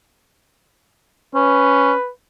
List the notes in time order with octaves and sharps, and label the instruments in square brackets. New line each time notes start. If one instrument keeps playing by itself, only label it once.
[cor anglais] C#4 [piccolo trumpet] B4